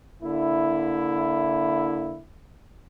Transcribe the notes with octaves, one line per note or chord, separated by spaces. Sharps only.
D3 A#3 E4